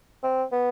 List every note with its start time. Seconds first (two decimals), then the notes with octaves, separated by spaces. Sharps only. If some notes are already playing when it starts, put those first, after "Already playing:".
0.23 C4
0.52 B3